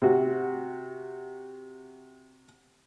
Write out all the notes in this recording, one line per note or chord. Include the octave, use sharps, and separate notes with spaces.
C3 F#4